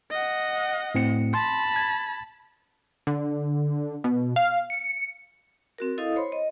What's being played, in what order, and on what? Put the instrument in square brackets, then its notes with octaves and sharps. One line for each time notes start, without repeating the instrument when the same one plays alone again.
[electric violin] D#5 F#5
[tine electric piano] A2 C4 C#7
[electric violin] A5 B5 [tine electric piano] C6
[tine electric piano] G#6
[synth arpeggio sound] D3
B2
F5
C#7
[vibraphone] C4 F#4 A#4
E4 A4 D#5 F5 D#6
C5 C#5 B5 C6
D#5